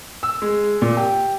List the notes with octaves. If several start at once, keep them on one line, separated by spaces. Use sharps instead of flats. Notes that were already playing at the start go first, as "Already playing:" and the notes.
E6
G#3
A#2
G4